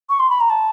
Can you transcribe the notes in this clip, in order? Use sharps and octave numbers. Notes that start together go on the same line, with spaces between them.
C#6
C6
B5
A#5
A5